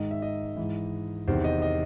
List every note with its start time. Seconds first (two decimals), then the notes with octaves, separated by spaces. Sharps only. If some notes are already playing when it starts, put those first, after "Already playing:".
Already playing: G#2 D#3 D#5
0.11 E5
0.22 D#5
0.57 G#2 E3
1.28 E2 C3 D#3 C5
1.44 D#5
1.62 D#5